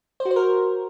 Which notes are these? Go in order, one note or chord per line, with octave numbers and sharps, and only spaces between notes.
C5
F#4
C5
A#4